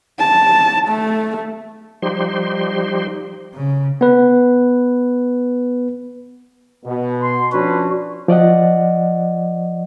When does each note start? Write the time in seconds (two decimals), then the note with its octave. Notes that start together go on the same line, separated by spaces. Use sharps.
0.19 A5
0.88 A3
2.02 F3 G3 D#4 G4 C5 C6
3.54 C#3
4.01 B3 B4
6.85 B2
7.22 C6
7.52 F3 C#4 D4 F#4 B4
8.28 F3 D5 D#5 F#5